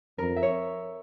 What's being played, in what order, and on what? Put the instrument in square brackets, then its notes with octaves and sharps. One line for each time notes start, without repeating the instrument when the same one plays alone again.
[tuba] F2 [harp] A#4
[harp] E5
C#5